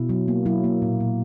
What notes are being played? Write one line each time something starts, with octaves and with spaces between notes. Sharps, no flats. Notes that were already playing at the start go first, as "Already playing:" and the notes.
Already playing: B2 E4
F#3
A#3
F#3 E4
A#3
A#2
A#2